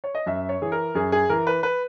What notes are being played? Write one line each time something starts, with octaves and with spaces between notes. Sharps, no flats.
C#5
D#5
F#2 E5
C#5
E3 G#4
A#4
F#2 G#4
G#4
E3 A#4
B4
B4